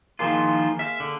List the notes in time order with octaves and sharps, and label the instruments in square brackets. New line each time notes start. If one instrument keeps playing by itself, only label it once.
[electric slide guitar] D#3 F3 F4 [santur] G#3 A#3 G#5
[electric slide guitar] E5 [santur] F5
[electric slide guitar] D3